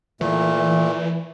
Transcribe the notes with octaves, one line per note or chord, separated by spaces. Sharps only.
A#2 E3 A3